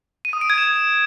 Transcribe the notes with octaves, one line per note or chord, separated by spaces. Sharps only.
D#7
D#6
D7
G#6
E7